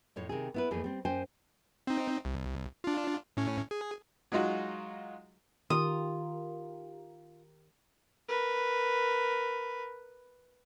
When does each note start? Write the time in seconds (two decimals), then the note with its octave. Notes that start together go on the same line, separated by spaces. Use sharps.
0.16 F2 A2 C#5
0.29 C3 D#3 G#4
0.54 B3 E4 B4
0.71 F2 E3 A3 A#3 G#4
0.84 G3 C4
1.05 F#2 C5 G5 G#5
1.87 C4 D#4
2.25 C2
2.84 D4 F4
3.37 A2 C#4
3.71 G#4
4.32 F#3 G#3 D#4 F4 F#4
5.70 D#3 F4 G4 A#4 D#6
8.28 A#4 B4